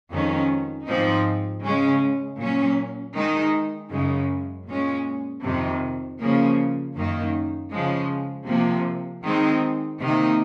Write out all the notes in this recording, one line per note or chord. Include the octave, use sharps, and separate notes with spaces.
F2 D#3 G#3 C#4
G#2 F3 C4 D#4
C#3 G#3 C#4
A#2 F#3 C#4
D#3 G#3 D#4
F#2 C#3 G#3
A#2 G#3 C#4
F2 C3 D#3
C#3 F3 A#3
F#2 D#3 A#3
C#3 F3 G#3
C3 F3 A#3
D#3 G#3 C4 D#4
C3 D#3 A#3 D#4